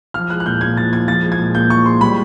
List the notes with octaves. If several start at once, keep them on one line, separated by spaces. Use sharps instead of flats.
F3 F6
G#3 F#6
F#6
A#2 G6
A#2 G#6
F3 A6
G#3 G#6
F3 A6
G#3
G#6
A#2
A#2 G6
F3 C#6
G#3 C6
G3 B5